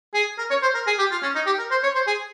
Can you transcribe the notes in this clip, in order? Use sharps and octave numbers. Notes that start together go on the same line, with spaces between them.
G#4
A#4
C#5
C5
A#4
G#4
G4
F4
C#4
D#4
G4
A#4
C5
C#5
C5
G#4